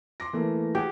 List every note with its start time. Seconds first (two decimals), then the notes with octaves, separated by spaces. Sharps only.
0.20 C6 D6 A#6
0.33 E3 A3 A#3
0.75 G4 G#4 F#5 G#5